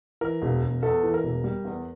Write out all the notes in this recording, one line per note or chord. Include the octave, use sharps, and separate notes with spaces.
E3 A#4
E1
E1
E2 A4
E3
A#4
E1
G3
E2